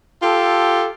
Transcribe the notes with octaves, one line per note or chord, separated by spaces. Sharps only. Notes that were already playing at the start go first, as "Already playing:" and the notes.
F4 G4 A4